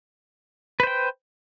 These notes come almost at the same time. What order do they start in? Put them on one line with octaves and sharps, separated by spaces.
B4 C5 G5